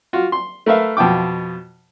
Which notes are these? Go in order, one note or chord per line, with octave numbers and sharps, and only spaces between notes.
F4 F#4
C6
A3 A#4 B4 E5 F5
F2 B2 F4 G5 D6